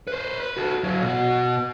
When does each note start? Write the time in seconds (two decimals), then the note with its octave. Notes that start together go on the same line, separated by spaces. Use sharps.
0.07 B4 C5
0.40 B4
0.57 F#4 A4
0.84 F#3 E4
1.02 B2 F#4